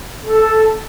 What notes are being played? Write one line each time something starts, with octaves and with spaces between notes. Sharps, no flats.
A4